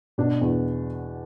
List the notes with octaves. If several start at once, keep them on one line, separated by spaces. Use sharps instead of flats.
B2 D4
E2